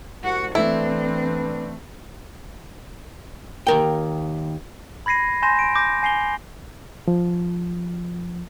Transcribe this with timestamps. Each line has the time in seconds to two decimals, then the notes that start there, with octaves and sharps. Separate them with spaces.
0.23 C2 F#4 F#5
0.55 E3 A3 C4 D4 E4 B4
3.67 D#2 A#4 G5
5.06 B5 G#6 A#6 C7 D#7
5.42 G#5 C6 G6 A#6 E7
5.59 D7
5.75 D6 G6 A#6
6.03 G#5 C7 F7 G7
7.08 F3